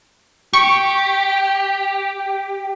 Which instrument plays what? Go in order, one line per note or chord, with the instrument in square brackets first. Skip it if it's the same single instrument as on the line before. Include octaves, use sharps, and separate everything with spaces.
[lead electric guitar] G4 [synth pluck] C#6